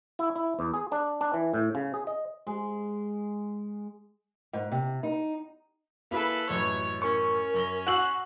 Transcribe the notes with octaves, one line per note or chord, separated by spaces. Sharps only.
E4
E4
E2
G#4
D4
D4
E3
A2
C#3
G#4
D#5
G#3
G#2
C3
D#4
A#3 E4 G#4 A4 B4
A1 F#2 B4 C#5
C#4 A#4 C#6
F#2 A#6 G7
F#4 G#5 E6 C7 F#7